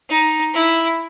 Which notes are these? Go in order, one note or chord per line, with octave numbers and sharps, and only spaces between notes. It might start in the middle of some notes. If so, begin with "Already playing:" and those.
D#4
E4